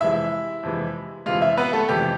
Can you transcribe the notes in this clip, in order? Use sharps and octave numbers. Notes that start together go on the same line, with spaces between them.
F2 C3 E3 G#3 E4 E5
F2 C3 E3 G#3
F2 C3 E3 G#3 F4 F5
E4 E5
B3 B4
A3 A4
F2 C3 E3 G#3 G4